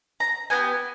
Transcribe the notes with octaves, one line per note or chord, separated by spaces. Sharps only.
A#5
B3 D#4 G4 G#5